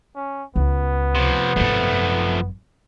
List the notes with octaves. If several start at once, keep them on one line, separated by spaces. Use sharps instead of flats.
C#4
C#2 B3
C3 F3
G#1 F#2 F3 A3